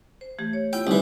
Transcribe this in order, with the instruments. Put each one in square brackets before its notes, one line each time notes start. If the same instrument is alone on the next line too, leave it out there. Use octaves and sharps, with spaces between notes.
[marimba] C5
E3 A3 G4
C#5
[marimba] B3 E4 F4 [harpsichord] G5
[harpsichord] C2 E3 [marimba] D#4